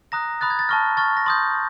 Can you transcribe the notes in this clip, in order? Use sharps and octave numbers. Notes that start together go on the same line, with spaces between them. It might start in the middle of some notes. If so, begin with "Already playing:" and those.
A#5 D#6 F#6 A#6
B5 D#6 F#6 A6
G#6
A6
A5 C#6 F6 A#6
C#6 F6 A6
A#6
C6 D#6 G6 A6